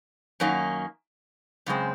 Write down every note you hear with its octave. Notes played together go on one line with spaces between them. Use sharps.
F#2 D#3 A#3 C#4
F#2 C#3 G#3 C4